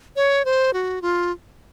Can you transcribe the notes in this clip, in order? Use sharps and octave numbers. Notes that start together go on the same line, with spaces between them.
C#5
C5
F#4
F4